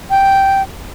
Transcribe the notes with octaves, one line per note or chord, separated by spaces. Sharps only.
G5